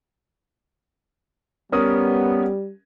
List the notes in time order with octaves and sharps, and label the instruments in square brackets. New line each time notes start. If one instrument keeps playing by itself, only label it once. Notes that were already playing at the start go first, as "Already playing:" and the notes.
[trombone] G3 [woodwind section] B3 [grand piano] C#4 A#4 D#6